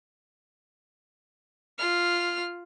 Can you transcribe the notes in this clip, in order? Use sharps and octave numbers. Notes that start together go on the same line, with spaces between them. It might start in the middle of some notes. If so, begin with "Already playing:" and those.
F4 F6